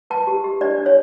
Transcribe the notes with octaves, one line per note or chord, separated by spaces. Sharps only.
B4 A5
G4
G4
D4 D5
D4
C#5